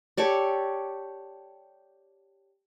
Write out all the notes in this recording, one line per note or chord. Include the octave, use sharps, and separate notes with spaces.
G4 A4 C#5 D5